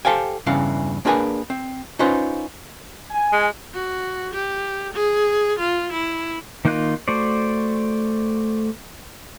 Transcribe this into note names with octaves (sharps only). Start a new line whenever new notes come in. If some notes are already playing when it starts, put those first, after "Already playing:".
G4 A4 C5 F5 G5 G#5
E2 G2 C#3 E3 F5
A#3 D4 G#4 A#4 B4 G#5
C4
C#4 D#4 F4 B4 C5
G#5
G#3
F#4
G4
G#4
F4
E4
D#3 A#3 D#4 F4 F#6
A3 F#4 C5 D5